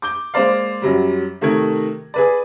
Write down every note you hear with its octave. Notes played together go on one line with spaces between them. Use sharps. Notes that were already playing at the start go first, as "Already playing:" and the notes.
D6 G6 G7
G#3 A#3 C5 D5 F5
F#2 F#3 G3
C3 D#3 A3 A#4 G#6
G#4 B4 D5